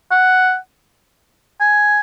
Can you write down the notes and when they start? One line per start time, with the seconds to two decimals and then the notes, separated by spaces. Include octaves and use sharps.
0.11 F#5
1.61 G#5